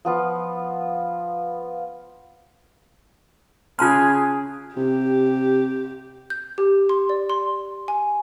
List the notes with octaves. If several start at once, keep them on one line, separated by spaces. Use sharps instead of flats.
F3 B3 F4
C#3 F4 G#4 A5 C6 F6 F#6
C3 G4
G6
G4
C6
D5
C6
G#5